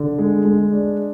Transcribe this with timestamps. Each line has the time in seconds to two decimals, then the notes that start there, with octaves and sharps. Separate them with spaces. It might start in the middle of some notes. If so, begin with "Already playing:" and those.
Already playing: D3
0.19 G#3
0.45 G#3
0.72 D4